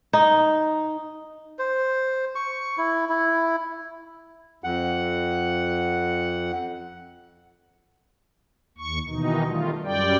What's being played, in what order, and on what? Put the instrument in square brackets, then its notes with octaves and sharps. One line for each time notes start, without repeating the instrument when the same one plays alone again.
[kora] D#4
[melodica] C5
C#6
E4
E4
[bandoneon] F2 F#5
[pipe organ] D#2 C#6
B2 D#3 E3 D#4
D#3 G3 A3 F4
F#2 G3 D5 G5